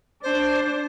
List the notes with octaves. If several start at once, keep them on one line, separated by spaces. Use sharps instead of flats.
D4 C5